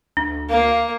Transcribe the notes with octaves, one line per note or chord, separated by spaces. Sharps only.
D2 D4
A#3 F5